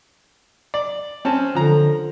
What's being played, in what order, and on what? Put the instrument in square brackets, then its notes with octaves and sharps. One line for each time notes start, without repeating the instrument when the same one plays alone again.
[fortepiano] D5
C4 C#4 A5
[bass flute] D3 [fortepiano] F3 A#5